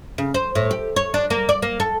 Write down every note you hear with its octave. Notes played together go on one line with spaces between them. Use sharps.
C#3
C5
A2
G4
C#5
D4
A#3
D5
A#3
A4